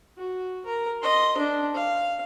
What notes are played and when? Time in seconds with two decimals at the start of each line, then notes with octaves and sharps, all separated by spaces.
0.18 F#4
0.65 A#4
1.02 D#5 C6
1.38 D4
1.75 F5